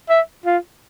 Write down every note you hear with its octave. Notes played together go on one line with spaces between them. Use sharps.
E5
F4